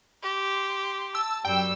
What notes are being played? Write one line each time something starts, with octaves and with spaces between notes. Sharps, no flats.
G4 C6
A5 E6
F#2 G3 G5 E6